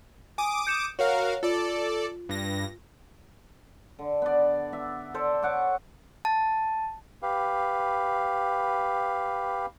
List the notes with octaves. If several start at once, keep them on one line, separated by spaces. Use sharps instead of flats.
G#5 D6 D#6 D7
G6 C#7 E7
F#4 A#4 C#5 F5
F4 A4 D5
G2 A#6
D3
B3 D5
B3 E5
A4 C5 D5 E5
C#5 F#5 D6
A5
G4 B4 F5